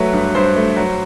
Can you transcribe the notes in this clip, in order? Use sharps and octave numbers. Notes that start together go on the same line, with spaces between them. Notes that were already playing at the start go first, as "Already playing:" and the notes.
Already playing: F#3 A3 B4
G2
G2 C5
A3
F#3